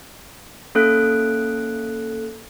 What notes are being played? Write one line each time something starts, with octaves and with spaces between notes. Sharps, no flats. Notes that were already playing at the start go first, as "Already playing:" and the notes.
A#3 C#4 A4 F5 F#6 D7